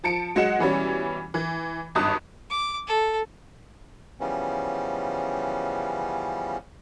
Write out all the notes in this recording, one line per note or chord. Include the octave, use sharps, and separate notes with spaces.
F3 A5 C#7 D7
F#3 G#3 F#5 C#7 E7
B2 E3 G3 C#4
E3
G#1 G2 A5 D#6 F#6
D6
A4
C#3 E3 F3 G3 B3 C#4